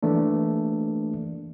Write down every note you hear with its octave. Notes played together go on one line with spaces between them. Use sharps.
E3 A3 A#3 D4